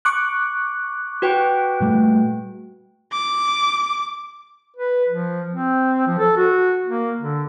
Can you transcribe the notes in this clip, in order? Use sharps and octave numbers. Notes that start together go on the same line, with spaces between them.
C#6 D6 F#6
F#4 B4 G5
A#2 G3 A3
D6
B4
F3
C4
F3
A4
F#4
A#3
D3